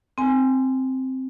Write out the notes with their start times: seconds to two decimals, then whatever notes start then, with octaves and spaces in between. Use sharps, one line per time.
0.18 C4 G#5